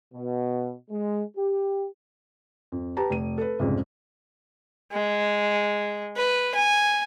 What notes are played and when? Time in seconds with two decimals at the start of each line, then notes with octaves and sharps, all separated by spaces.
0.13 B2
0.90 G#3
1.37 G4
2.72 F2
2.97 G4 B4 A5 A#5
3.10 F1 D#7
3.38 A4 B4
3.59 C2 F2 G#2 C#3
4.93 G#3
6.17 B4
6.55 G#5